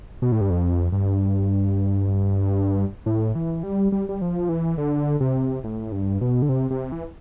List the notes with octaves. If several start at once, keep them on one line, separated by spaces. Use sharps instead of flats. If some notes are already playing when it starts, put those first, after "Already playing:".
B2
A2
G2
F2
G2
A2
E3
G3
G3
G3
F3
E3
D3
C3
A2
G2
B2
D3
C3
C3
E3